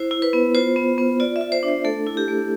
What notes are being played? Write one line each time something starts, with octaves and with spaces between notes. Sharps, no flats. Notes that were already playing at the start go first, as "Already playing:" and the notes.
Already playing: E4 C5
E4
B4
B3
F4 C5
B3
B3
F4 D5
E5
F4
C5
D4
C5
A3 A4
E4
G4
A3